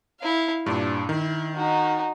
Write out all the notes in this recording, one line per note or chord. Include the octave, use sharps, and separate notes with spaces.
E4 F5
G2 A#2 D4
D#3 E4
D#4 F#4